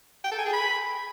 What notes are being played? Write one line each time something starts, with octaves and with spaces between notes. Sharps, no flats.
G5
A4
G#5
G#4
B5